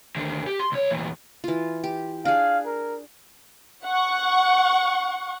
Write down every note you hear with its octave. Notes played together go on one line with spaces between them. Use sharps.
D#2 D3
G4
C6
C#2 C#5
E2 A#2
E3 F4
G4
D4 G#4 F5
A#4
F#5 C#6